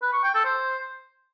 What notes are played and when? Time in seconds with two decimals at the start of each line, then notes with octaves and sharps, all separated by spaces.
0.03 B4
0.13 C#6
0.24 G5
0.34 A4
0.45 C5